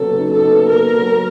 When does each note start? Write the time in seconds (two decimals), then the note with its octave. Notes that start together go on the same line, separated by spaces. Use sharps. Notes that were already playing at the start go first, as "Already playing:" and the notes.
Already playing: C#3 F#3 B3 A4
0.19 D#4
0.31 A4
0.44 B3
0.69 A#3 A#4
0.95 F#3